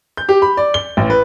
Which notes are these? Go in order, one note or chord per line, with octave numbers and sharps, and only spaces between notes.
G6
G4
B5
D5
G7
A1
B4